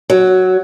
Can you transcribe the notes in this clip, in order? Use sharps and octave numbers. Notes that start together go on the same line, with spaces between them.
F#3